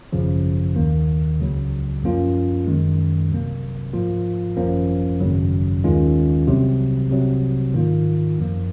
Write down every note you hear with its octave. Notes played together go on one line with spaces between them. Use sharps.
G#1 F#2 C#3 F3
D#2 D#3 A#3
C#2 C#3 F#3
F#2 F3 A#3 C#4 F4
F#2 D#3 G#3
C2 C3 F#3 A#3
G#2 F3 A#3 F4
G#1 F#2 F3 A#3 C#4
G#1 F#2 C#3 F#3
D#2 D#3 G#3 C#4 F4
C2 C3 F#3
C2 C3 F#3
G#2 D#3 A#3 F4
F#2 F3 A#3